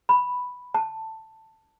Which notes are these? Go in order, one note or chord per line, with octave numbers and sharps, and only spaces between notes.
B5
A5